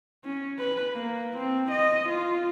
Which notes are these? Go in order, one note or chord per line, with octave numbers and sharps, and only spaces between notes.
C#4
B4
A#3
C4
D#5
F4